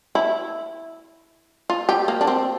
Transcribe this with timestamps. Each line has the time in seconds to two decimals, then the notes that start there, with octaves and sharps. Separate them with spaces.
0.15 E4
1.70 F4
1.89 G4
2.08 A#3
2.21 D4
2.27 C4